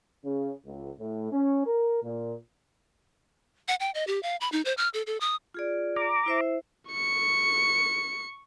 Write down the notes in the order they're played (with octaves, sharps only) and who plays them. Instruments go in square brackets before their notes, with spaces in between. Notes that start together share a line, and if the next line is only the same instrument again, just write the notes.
[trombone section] C#3
C#2
A2
C#4
A#4
A#2
[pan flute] F#5
G5
D#5
G4
F5
B5
D#4
C5
F6
A4
A4
D#6
[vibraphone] F4 G#4 D5
[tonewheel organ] A#5 D6
[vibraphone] E4 C5 E5
[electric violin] C#6 C#7